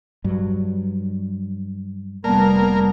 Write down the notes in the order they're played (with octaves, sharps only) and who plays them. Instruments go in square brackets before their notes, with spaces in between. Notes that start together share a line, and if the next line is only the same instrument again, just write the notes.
[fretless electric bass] G2 F#3
[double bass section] F1 B3 [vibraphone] G3 D5 A5 [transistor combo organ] A#3 A#4